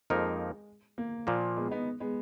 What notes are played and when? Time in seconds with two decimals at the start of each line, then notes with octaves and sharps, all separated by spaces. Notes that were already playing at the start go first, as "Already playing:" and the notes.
0.10 F2 F3 G#3 A#3 D#4 A#4
0.98 A#3
1.27 A#2 F3 A#3
1.56 G#3 B3
1.71 B3 D#4
2.00 G#3 B3